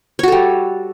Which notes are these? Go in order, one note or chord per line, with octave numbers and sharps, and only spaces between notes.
G3 F#4 A4 C#5